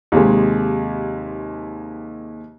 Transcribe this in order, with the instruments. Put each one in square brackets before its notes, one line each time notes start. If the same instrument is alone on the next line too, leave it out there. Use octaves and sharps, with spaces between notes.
[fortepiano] D#2 C3 G#3